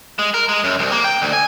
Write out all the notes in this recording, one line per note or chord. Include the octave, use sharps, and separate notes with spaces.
G#3
A#4
G#3
F#2
C2
A#3
G5
D2
G#5